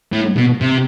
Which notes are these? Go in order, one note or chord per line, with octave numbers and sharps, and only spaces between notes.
A2
B2
C3